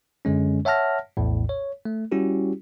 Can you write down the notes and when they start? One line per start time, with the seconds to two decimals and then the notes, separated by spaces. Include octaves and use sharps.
0.25 F#2 D3 G#3 C#4
0.65 C#5 E5 F#5 A5 F6 A#6
1.17 A#1 E2 A2
1.49 C#5
1.85 A3
2.12 G3 C#4 E4 F#4 G4